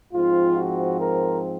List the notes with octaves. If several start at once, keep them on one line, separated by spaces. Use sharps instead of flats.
G#2 F3 C4 F4
F#4
A#4